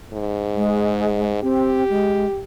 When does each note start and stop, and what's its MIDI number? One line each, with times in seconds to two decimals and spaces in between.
0.13 1.40 44
0.56 1.31 56
1.42 1.84 60
1.42 2.43 67
1.90 2.26 56